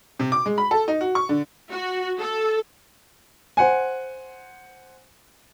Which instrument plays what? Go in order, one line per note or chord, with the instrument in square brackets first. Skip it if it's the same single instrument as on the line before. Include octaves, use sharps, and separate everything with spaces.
[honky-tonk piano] C3
D6
G#3
B5
A4
D#4
F#4
C#6
D3
[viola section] F#4
A4
[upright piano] C5 F#5 G#5